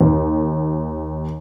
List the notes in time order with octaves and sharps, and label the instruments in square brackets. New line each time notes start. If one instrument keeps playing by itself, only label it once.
[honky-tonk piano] D#2